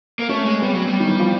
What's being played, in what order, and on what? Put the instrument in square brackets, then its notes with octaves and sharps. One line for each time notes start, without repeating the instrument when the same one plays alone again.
[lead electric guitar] A#3
[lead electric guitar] A3 [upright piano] C#4
[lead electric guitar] G#3
[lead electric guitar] G3 [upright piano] B3
[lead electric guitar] F#3
G3
[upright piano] D#3
E3
F3